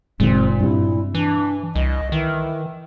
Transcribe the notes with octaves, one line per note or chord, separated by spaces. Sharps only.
F#1 A#2 D#3 G#3 C4
G2 C3 E4
E3 D4
C2 D#5
D#3 E3